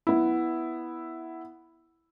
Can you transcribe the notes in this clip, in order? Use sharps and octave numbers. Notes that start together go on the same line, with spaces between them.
B3 E4